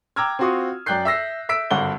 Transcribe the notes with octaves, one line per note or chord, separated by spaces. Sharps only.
G5 A#5 D6 E6 F6 G#6
C4 F4 F#4 C6 C#6 D#6
F#2 D5 G5 F#6 G6 C7
E5 E6 A#6 C7
E5 E6 B6 D7
G#1 G2 D3 F#5 G7